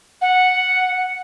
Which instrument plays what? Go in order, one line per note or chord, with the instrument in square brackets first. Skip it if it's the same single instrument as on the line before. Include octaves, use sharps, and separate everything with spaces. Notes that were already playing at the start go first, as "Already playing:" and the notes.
[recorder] F#5